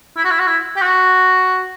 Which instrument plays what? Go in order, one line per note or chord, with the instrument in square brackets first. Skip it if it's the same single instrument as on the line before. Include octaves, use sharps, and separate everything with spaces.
[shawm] E4
F#4
E4
F#4
E4
G4
F#4